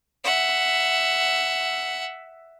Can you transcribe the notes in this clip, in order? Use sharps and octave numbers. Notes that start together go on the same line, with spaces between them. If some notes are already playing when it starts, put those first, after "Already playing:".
E5 F#5